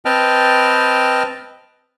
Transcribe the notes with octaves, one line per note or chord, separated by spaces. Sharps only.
C4 B4 D#5 G5 A5 F6